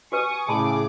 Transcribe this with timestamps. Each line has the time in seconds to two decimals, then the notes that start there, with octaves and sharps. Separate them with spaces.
0.12 F#4 G4 B4 G#5 C#6 D#6
0.49 A2 C#3 G#4 A5 B5 C6 D6